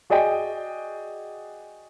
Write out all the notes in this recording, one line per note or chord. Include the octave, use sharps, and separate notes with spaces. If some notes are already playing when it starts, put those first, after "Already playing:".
F#4 G#4 D5 D#5 G5